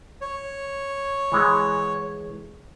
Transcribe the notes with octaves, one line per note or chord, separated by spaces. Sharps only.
C#5
E3 G#3 F#5